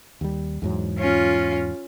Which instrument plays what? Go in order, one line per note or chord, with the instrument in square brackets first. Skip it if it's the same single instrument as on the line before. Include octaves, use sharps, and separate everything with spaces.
[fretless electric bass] D#2 G3
E2 G#2 F#3
[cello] C#4 F4